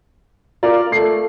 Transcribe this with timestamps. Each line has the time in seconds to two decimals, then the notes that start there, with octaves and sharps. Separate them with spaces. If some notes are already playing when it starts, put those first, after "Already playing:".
0.63 F4 A#4 D5
0.92 A3 C7